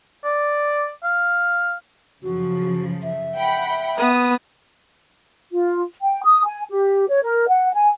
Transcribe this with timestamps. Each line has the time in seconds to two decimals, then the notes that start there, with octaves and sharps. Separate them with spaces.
0.25 D5
1.03 F5
2.23 F#2 C#3 F3 F#4
3.03 E5
3.36 F#5 G5 B5
3.69 E5
3.98 B3 D#6
5.52 F4
6.02 G5
6.24 D#6
6.45 G#5
6.70 G4
7.09 C#5
7.24 A#4
7.48 F#5
7.73 G#5